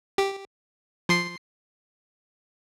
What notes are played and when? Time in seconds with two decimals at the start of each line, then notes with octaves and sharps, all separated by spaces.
0.18 G4
1.09 F3 C6 C7